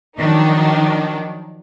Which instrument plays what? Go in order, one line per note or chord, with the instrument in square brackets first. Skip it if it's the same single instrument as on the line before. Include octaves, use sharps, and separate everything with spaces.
[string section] D#3 F3 F#3 D4 D#4